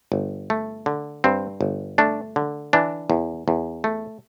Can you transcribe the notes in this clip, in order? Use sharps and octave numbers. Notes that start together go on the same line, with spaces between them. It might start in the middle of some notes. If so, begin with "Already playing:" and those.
G1
A3
D3
G2 C4
G1
A3 D4
D3
E3 D4
E2
E2
A3